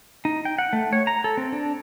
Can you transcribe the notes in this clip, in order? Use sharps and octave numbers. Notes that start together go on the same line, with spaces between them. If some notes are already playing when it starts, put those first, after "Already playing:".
D#4
G5
F#5
A3
C#5
A#5
A4
C4
D4